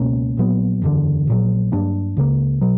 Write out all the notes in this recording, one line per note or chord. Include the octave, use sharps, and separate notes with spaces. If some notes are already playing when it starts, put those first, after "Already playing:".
Already playing: C#2 B2 A#3 C#4
A#1 A#2 F#3 B3
F#1 E2 D3
A#1 A#2 F#3
G2 F#3 A#3 D4
C#2 C#3 F#3 A#3
B2 F#3